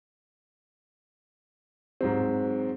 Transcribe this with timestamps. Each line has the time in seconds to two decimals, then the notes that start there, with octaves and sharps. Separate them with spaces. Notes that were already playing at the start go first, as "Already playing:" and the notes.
2.01 G#2 F#3 C4